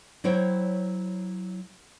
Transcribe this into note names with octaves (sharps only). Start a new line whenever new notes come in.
F#3 E4 C5 C#5 G5